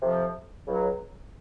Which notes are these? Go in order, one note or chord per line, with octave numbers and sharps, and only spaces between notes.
F2 C3 F3
C#2 C#3 F#3